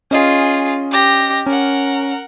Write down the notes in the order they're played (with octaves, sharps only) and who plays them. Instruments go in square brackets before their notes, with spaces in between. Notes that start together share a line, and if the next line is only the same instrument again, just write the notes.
[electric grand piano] C#4 D#5 [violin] F4 G#4
[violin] G4 A#6
[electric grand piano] C#4 [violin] A#4 F#5